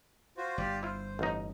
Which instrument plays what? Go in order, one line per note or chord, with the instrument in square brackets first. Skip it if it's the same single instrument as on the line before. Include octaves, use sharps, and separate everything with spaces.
[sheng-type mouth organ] F4 F#4 C5
[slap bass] G1 [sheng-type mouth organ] F4 G4 D5
[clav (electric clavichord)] E4 F4 [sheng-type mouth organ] C5
[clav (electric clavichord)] A1 D#4